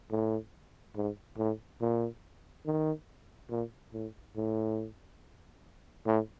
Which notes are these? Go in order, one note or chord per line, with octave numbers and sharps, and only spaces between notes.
A2
G#2
A2
A#2
D#3
A#2
A2
A2
A2